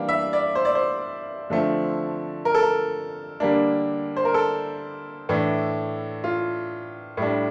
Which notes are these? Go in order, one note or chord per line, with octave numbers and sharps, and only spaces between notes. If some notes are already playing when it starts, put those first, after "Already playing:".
Already playing: E3 G3 A#3 D4 F5
E5
D5
C5
D5
C5
D3 F3 A3 C4
A#4
A4
A#4
D3 G3 A#3 D4
C5
A#4
A4
A2 E3 A3 D4
F4
A2 G3 D4